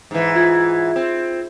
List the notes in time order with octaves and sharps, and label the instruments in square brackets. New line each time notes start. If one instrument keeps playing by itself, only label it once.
[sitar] G#2 E3
[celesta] F4 G#6
[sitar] C4